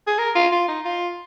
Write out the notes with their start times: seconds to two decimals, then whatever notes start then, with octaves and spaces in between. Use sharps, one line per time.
0.07 G#4
0.19 A#4
0.35 F4
0.52 F4
0.68 D#4
0.85 F4